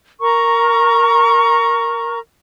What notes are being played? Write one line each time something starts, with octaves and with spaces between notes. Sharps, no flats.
A#4 A#5 C#6